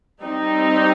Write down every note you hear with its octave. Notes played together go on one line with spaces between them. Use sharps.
G3 C4 D#4